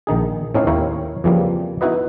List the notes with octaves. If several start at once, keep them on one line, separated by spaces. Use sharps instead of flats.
A#1 D#3 D#4 G#4
A2 C4 C#4 D#4 C#5 F5
D#2 E4 A#4 C#5 F5 G5
F2 C#3 E3 F3 G3 A#3
B3 D#4 E4 F#4 B4 D#5